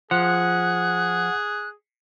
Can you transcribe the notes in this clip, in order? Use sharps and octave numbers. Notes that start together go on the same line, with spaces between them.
F3 G#4 F#5 F#6